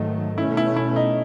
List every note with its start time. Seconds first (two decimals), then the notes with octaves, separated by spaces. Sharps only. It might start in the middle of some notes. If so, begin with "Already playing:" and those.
Already playing: G#2 D#3 F#3 A3 D#4
0.37 B2 A3 C#4 E4
0.57 E4
0.76 E4
0.96 D#4